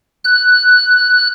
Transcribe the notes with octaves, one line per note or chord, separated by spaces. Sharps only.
F#6